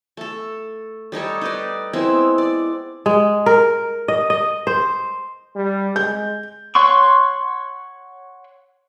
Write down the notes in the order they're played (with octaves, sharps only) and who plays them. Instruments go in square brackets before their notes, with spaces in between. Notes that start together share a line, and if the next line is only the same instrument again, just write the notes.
[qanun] A3 A4
G3 D#4 A4 C#5
D#4 B4 D5
G#3 B3 C4 E4
D5
[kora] G#3
A#4
D#5
D#5
C5
[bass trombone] G3
[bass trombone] G#3 [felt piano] G6
[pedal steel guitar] C#5 F#5 C6 C#6